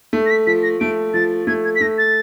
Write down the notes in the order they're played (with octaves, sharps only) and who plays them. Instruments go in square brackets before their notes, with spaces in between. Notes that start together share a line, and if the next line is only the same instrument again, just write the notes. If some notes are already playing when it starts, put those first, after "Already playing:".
[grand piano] A3
[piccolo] A#6
B6
[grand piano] F3 [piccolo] B6
[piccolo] A#6
[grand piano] A3 [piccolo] D7
[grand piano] F3 [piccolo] A6
[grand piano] A3 [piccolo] G#6
[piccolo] G#6
B6
[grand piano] A3 [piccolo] A#6
[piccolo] A6